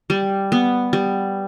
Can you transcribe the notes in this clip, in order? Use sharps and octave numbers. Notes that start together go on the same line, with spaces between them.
G3
B3
G3